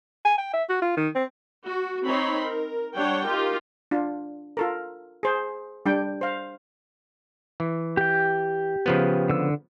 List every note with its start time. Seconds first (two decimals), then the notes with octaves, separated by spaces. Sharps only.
0.25 G#5
0.38 G5
0.53 E5
0.69 F#4
0.82 F4
0.97 D#3
1.15 C4
1.66 F#4
2.05 C4 D#4 C#5 B5 C6
2.41 A#4
2.95 G3 D4 C#5 F#5 G5
3.25 D#4 F4 G4 A#4
3.91 D4 F4
4.57 F4 A4 A#4
5.23 G#4 C5
5.86 G3 D4 G5
6.21 C5 F5
7.60 E3
7.97 G4 G5
8.86 C#3 F3 B3
9.30 D3 E6